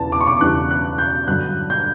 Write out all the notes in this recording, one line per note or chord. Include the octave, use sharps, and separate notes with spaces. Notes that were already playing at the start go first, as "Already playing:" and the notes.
Already playing: E2 C#3 A5
D6
C#6
D6
E2 C#3 E3 G3 F#6
F#6
G6
G2 D3 F#3 F#6
G6